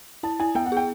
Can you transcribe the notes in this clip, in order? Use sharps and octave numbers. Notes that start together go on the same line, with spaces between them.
E4 A5
E4 G#5
B3 G5
F#5
G#4 G5